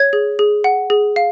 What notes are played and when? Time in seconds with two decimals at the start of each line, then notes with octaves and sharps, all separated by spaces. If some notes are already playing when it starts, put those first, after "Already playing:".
Already playing: C#5 G#6
0.13 G#4
0.39 G#4
0.64 F#5
0.90 G#4
1.16 F5